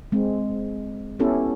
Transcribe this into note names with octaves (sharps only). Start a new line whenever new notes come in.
G#3 C4
B3 C#4 E4 G4 A4